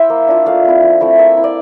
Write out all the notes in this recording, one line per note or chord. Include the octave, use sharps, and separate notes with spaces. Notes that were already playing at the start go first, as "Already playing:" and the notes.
Already playing: E4 C5 E5
A#3
D4 F4
A3 F5
C4 E4
F3
A3 C4 E4
A#3 E5
E4
D5